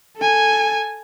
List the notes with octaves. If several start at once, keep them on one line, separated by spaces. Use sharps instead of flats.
A4 G#5